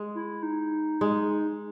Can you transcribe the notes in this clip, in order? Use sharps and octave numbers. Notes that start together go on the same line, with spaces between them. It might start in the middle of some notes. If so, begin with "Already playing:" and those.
Already playing: G#3
E4
D#4
G#3